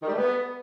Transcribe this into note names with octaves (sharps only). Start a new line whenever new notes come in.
D#3
G3
A3
B3